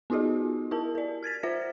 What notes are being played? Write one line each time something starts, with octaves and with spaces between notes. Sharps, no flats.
B3 D#4 F4 F#4 G#4 D#5
E4 G4 A#4 A5
A#4 D5
F6 G#6 A6 B6
F4 C5 E5 A#6